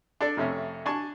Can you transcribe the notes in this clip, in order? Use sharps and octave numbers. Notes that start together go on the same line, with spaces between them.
D4 A4 D5
F2 C3 A3 C#4
D4 G#5 A5 C#6